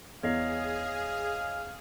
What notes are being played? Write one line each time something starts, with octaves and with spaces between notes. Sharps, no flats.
E2 G#4 C#5 D#5 F5 C7